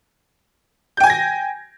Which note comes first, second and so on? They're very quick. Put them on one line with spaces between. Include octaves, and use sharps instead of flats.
G6 G5 G#5 G#6 A#6